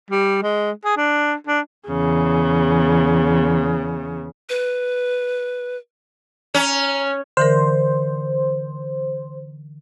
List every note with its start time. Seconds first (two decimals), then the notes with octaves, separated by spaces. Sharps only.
0.10 G3
0.43 G#3
0.84 G#4
0.97 D4
1.47 D4
1.88 E2 C#3
4.49 B4
6.55 C#4 A#5
7.37 D3 E3 A#4 C5